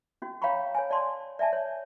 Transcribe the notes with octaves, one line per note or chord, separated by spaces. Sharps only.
C#4 F#4
C#5 F5 G5 A#5 B5 C#6
C#5 G#5
C#5 D5 A5 C6
D5 E5 G#5 A5
C#5